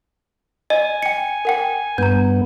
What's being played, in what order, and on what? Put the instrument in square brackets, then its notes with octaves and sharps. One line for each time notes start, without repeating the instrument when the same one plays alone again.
[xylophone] D#5 [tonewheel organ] G#5
[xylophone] G5 C#7
A#4 F#5 G5
[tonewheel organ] G2 B3 [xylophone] A#5 G6